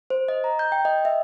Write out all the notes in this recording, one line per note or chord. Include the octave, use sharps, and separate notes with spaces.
C5
D#5
A#5
G6
G5
D#5
E5